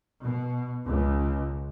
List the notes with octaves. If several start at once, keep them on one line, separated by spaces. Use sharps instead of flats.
B2
C#2